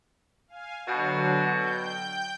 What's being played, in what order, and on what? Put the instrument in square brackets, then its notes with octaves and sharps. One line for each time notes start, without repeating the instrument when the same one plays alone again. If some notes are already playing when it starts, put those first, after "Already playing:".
[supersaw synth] F5 G#5
[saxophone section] B2 F#4 [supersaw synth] D3 F#3
[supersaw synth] G5 G6